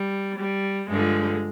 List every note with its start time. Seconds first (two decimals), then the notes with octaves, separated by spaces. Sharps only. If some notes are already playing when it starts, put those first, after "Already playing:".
Already playing: G3
0.38 G3
0.89 G2 D3 F3 G#3